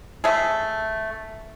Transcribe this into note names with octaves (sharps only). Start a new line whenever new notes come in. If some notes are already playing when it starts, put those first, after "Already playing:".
A3 G#4